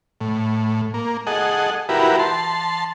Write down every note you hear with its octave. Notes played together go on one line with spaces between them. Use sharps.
A2
A#3
G#4 A4 D#5 F#5
E4 F#4 G4 A#4 B4
A5 C6